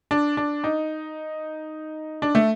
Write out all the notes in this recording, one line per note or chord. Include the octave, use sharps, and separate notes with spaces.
D4
D4
D#4
D4
A3